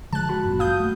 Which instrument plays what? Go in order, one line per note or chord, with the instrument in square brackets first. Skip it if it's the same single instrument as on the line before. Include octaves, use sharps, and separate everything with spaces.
[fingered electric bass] D3 F3 G#3 [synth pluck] A5 F#6
[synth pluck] F#4 B5
[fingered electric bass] G1 F#2 A#2
[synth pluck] F5 D#6 G6
[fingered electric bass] A3